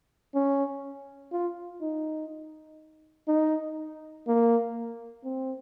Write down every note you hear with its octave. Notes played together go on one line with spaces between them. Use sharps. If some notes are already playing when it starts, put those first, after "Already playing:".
C#4
F4
D#4
D#4
A#3
C4